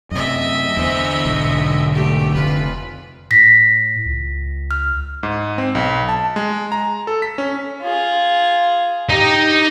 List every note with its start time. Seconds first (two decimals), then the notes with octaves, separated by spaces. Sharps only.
0.11 F#2 C3 D#5 E5
0.77 E2 D3 C5
1.25 B1 G#2
1.92 A3 G4
2.34 F1 F4 B4
3.31 A2 A#6 B6
4.05 C#2
4.71 F6
5.23 G#2
5.58 C4
5.75 B1
6.09 A5
6.36 G#3
6.72 A#5
7.07 A4
7.22 B6
7.38 C#4
7.82 F4 G#4
9.09 D#4 G4 D#5